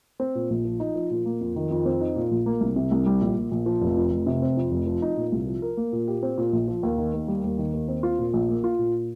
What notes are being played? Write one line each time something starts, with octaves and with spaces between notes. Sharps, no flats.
C4
A#2
A#1
F3
D#4
F3
A#2
A#3
F2
D#3
F2
C4
D#4
A#2
A#1
A#3
C2
C3
C2
G3
A#1
A#2
A#1
F3
F1
F2
F1
C3
C4
F2
F1
F3
D#4
A#2
C2
F3
A#4
A#3
A#2
G4
C4
A#2
A#1
F3
D#2
D#3
D#2
G3
D#2
D#3
D#2
C4
F4
A#2
A#1
A#3
F4
A#2